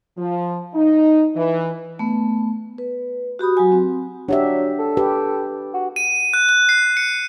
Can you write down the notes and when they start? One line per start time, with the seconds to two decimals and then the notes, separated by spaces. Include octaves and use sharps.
0.17 F3
0.74 D#4
1.36 E3
1.99 A3 B3
2.78 B4
3.39 F#4 G4 B5 D#6
3.57 F#3 F#4 G#5
3.72 C4
4.29 F#3 D4 G4 E5
4.79 A4
4.97 G4 B4
5.74 F#4
5.96 D#7
6.34 F#6
6.49 F#6
6.69 C7
6.97 C#7